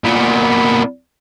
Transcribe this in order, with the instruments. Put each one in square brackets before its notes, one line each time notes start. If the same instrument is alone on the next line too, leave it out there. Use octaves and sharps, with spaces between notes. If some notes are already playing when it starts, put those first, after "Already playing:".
[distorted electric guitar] A#2 B3